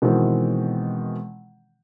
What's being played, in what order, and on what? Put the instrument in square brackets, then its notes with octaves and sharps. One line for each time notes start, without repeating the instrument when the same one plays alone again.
[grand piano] B2 D#3 E3 G#3 C4